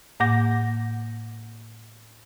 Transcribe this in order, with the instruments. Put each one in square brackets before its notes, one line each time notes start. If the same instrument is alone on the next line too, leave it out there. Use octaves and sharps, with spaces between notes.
[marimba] A2 A#3 F#5 D6 G6 A#6